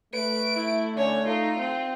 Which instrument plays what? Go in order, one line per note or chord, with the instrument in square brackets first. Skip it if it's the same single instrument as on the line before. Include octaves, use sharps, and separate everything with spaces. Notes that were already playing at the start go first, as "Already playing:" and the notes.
[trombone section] A3 [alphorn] B4 [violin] D7
[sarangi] E4
[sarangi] D3 [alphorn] C#4 [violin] C#5
[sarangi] D#4 [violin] F4 [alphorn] A4
[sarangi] C4